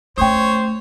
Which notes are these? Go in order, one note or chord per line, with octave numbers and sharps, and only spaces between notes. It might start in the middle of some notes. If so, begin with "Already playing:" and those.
A3 C#4 C5 C#5 G5 D#6